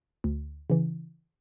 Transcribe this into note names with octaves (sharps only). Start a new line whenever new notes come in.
D2
C#3 E3